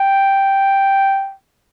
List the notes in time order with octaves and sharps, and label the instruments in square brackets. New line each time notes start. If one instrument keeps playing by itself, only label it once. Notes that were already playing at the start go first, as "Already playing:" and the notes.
Already playing: [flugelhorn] G5